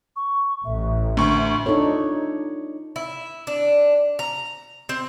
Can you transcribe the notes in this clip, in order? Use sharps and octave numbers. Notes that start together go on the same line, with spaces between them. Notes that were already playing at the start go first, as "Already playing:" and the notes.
C#6
A1 E5
D2 C#6
D4 D#4 F4 A4 C#5
E4
D4
A#5
C4